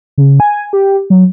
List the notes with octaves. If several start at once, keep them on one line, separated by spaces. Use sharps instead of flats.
C#3
G#5
G4
F#3